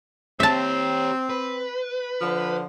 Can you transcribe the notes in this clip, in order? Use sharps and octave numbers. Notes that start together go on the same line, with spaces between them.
C4 G4 C#5 E5 A5
B4
D3 F3